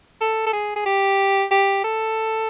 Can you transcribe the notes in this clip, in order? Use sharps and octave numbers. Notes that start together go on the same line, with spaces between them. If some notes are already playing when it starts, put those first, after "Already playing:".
A4
A4
G#4
G#4
G4
G4
A4